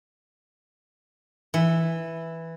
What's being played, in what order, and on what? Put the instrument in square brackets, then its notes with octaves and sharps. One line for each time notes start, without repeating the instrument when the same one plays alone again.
[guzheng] E3